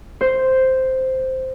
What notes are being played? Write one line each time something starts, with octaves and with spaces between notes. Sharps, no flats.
C5